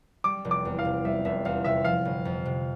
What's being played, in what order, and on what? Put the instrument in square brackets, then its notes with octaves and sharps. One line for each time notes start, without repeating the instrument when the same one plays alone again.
[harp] G3 [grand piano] D6
[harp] F1
[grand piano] D6
[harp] E2
[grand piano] F5
[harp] C3
[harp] G3 [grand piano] E5
[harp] F1 [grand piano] E5
[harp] E2 [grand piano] F5
[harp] C3 [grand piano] E5
[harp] F3 [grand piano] F5
[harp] G1
F2
C3